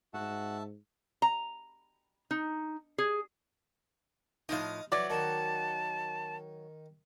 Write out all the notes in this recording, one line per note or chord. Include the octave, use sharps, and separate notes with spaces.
G#2 F#4 E5 F#5 A5
A#5
D#4
G#4
A2 F3 D#4 D#5 F5 D#6
E3 F#3 F#4 D5
D#3 A5